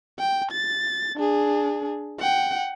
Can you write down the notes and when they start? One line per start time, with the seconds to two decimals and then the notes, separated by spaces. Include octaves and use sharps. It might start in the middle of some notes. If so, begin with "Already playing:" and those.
0.19 G5
0.51 A6
1.16 D4 G#4
2.20 F#5 G5